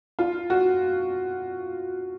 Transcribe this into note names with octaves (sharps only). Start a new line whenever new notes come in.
F4
F#4